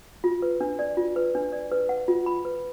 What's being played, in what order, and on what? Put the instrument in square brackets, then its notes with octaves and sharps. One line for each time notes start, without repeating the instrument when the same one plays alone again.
[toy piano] F4
B4
D4
D5
F4
B4
D4
D5
B4
F#5
F4
B5
B4